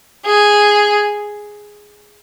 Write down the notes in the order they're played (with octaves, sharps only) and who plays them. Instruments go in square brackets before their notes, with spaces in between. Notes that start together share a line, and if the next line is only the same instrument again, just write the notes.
[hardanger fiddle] G#4